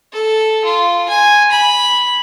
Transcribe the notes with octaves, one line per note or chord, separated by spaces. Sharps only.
A4
F4
G#5
B5